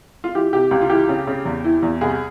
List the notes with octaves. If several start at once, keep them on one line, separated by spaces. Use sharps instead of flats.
F4
E3 G4
C3 G4
C#2 G4
F4
E3 G4
C#3
C#3
E2
E3
E2
C2 G#4